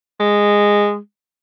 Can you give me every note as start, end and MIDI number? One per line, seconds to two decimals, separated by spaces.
0.20 0.97 56